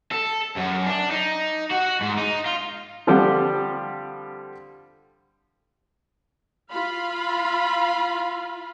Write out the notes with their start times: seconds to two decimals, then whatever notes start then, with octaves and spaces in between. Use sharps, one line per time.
0.11 A4
0.56 F#2
0.86 D4
1.10 D#4
1.71 F#4
2.02 G#2
2.18 D#4
2.46 F4
3.07 D3 F3 G3 C4 G4 F#5
6.68 F4 F5 B5